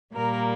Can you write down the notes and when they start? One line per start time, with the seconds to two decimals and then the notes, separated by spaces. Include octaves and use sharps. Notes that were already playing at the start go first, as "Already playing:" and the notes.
0.15 A#2 G3 A#3 A#4